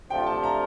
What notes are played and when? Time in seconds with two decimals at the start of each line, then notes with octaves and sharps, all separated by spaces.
0.10 C3 F3 A3 D4 F4 G5
0.27 A5
0.43 A#5